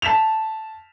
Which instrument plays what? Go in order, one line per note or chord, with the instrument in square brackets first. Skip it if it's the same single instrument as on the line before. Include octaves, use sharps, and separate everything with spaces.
[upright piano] A5 B6 E7 F7